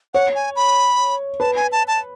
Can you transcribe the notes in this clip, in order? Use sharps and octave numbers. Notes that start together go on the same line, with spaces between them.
C#5 F#5
G#5
B5
B4 A5
G#5
A5
A5